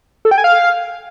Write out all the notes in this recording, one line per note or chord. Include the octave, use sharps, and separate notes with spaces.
A4
G5
G#5
F5